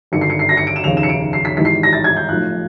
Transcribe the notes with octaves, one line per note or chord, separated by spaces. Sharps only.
G#1 G2 D3 C#7
C7
C#7
C7
A#6
C#7
D7
E7
F1 D#2 C#3 F7
E7
C#7
D7
C7
B6
G#1 G#2 E3 G3 B6
C7
A#6
A6
G#6
G6
B1 A2 F3 F#6